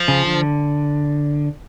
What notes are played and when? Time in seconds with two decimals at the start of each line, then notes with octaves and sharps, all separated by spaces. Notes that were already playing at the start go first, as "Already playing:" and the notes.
Already playing: F3
0.08 C#3
0.26 D3